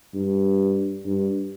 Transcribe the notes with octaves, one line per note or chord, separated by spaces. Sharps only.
G2
G2